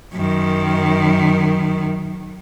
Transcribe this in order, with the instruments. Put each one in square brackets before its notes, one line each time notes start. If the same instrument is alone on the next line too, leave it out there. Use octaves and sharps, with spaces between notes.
[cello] F#2 D#3